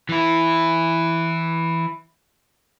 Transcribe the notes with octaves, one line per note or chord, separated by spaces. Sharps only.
E3 E4